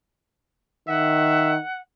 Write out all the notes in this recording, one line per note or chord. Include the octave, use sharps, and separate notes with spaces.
D#3 E5 F#5